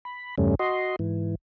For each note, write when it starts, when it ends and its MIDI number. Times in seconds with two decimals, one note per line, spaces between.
0.05 0.35 83
0.38 0.55 40
0.38 0.55 43
0.38 0.55 49
0.38 0.55 55
0.38 0.55 57
0.38 0.55 61
0.59 0.96 66
0.59 0.96 75
0.59 0.96 84
0.99 1.35 44
0.99 1.35 52